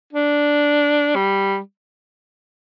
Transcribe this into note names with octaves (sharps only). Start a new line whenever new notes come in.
D4
G3